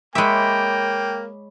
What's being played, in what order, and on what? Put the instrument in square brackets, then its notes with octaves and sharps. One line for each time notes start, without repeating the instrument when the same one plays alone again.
[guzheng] G#3 E5 [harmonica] A#3 [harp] C#5 B5 D6 [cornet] G5